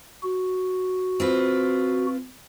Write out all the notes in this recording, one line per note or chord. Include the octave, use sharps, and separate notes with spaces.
F#4
C4 F4 B4